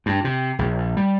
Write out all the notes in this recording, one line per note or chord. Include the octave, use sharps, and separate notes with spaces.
G2
C3
A#1
G3